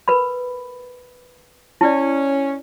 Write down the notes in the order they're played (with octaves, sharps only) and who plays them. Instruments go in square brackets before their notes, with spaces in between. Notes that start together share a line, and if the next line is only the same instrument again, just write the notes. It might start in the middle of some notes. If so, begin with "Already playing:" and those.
[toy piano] A#4 B4 B5
[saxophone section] C#4 [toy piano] E4 D5